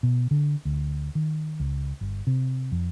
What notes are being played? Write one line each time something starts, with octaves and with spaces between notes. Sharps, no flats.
B2
D3
D2
D#3
C#2
G1
C3
F2